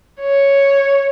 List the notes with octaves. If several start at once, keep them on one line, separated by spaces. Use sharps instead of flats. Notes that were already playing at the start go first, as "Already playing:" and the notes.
C#5